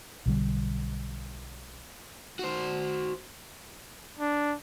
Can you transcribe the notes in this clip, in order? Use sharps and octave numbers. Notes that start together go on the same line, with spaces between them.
B1 D3 G3
F#4 C5
D4